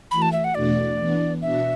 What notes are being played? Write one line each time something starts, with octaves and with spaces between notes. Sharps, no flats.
E3 A3 F#4 B5
A5
E5
F#5
E2 B2 A3 D4 F#4 D5
E3 B3 D4
B2 B3 D4 F#4 E5